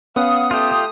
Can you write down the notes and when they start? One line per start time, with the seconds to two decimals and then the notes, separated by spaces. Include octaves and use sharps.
0.16 B3 C#4 B4 F5 F#5 D#6
0.51 A3 F4 G4